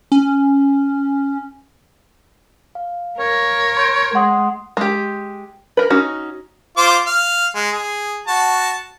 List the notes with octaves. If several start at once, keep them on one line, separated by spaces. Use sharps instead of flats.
C#4
F5
A#4 C#5
C6 G6 D7
G#3 F#5 C6 D#6
G#3 G4
A#4 B4
C#4 D#4 F#4
F4 C5 D6
F5
G#3
G#4
F#4 A5